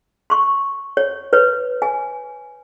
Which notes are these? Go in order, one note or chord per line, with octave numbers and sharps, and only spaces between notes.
C6 C#6
C#5
B4 C#5
G#5